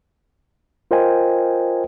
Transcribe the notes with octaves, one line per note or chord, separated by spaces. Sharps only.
F4 A#4 C5 D#5 G5 G#5